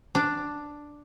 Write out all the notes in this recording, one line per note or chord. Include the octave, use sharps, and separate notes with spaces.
D4